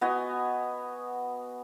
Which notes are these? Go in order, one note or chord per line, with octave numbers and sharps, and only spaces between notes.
B3 F#4 D#5 G#5